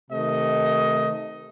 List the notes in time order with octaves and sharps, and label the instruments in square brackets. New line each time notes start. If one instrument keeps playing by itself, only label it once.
[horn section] C3 D#3 A3 D#5